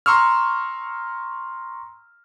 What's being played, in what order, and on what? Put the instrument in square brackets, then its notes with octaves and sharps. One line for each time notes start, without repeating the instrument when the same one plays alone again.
[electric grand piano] A#5 C6 C#6 E6 F6